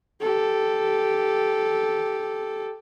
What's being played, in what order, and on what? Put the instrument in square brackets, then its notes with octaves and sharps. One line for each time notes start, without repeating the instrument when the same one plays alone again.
[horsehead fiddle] G4 A4